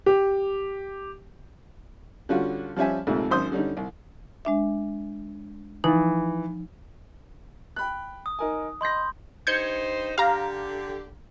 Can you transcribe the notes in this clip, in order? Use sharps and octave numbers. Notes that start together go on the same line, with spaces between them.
G4
D3 G3 C#4 F4 F#4
F3 G3 C#4 E5 G#5
A#1 F2 G#2 C3 A3
G#1 F#2 C5 C6 D#6
D3 G3 C#4 D#4
C2
G#3 D4 E5
E3 F3 D#4
G5 B5 F#6
D#6
D#4 A#4 G#5
D#5 B5 C6 G6 A#6
G2 D#4 C5 G6 G#6 C#7
D3 G4 F5 A#5